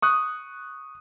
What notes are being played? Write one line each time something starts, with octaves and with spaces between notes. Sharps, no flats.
C#6 D#6 F#6